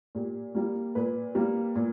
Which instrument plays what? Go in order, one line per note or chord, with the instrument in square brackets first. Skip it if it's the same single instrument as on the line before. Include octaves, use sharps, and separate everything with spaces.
[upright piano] A#2 G4
G3 A#3
A#2 B4
G3 A#3
A#2